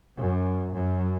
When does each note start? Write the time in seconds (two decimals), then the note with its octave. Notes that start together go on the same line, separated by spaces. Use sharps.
0.18 F#2
0.74 F#2